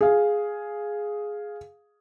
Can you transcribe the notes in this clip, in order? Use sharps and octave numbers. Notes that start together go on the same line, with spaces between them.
G#4 F5